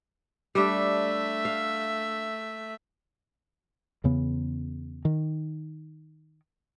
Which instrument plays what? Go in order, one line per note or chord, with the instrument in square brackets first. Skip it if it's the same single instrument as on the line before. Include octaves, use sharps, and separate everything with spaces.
[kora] G3 D4 [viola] A3 E5
[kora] F5
[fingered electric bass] E2 C#3 B3
D#3